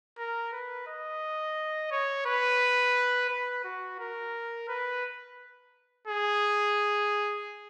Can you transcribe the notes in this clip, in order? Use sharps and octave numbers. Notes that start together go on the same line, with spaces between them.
A#4
B4
D#5
C#5
B4
B4
F#4
A#4
B4
G#4